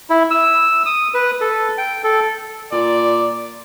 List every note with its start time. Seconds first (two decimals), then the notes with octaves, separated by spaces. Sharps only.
0.10 E4
0.31 E6
0.86 D#6
1.14 B4
1.41 A4
1.78 G5
2.04 A4
2.72 A#2 D5